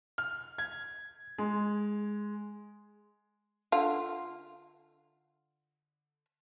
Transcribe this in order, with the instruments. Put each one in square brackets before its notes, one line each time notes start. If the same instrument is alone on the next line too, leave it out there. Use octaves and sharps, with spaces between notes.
[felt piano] F6
G#6
G#3
[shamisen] D3 F4